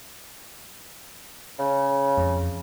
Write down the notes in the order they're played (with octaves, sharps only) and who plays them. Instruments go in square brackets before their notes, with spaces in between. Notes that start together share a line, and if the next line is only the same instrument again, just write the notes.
[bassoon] C#3
[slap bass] F2